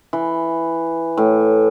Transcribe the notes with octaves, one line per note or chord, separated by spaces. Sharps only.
E3
A2